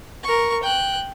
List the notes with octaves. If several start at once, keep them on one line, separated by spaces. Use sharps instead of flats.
A#4 C#6
G5 F#6